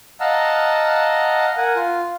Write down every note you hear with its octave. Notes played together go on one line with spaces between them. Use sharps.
D#5 F5 F#5 A5 A#5 E6
A#4 F#5 G#5
F4